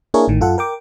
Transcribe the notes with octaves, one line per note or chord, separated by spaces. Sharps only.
A#3 D4 E4 G#4 A#4 C#5
A1 A2 D#3
F#2 F4 A4 F#5
A#4 G5 D6